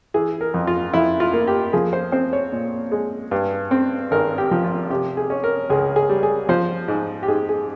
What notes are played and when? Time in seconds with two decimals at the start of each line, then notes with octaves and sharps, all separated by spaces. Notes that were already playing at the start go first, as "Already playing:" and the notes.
0.14 E3 G#4
0.41 A#4
0.54 F2
0.67 F4
0.93 F2 E4
1.20 F4
1.33 A#3
1.47 G4
1.73 F3 G#4
1.93 C5
2.12 C4 C5
2.33 C#5
2.53 A#2
2.92 G#3
3.31 G2
3.71 C4
4.11 G#1 A#4
4.38 G4
4.51 F3
4.64 F4
4.90 C3 G4
5.17 G#4
5.30 C#4
5.44 A#4
5.70 C#2 G#4
5.96 G#4
6.09 G3
6.23 G#4
6.49 F3 C5
6.88 G#2
7.23 G4
7.28 G#2 G#4
7.49 G#4